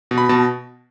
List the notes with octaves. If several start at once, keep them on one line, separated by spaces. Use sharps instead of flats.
B2
B5
B2 A5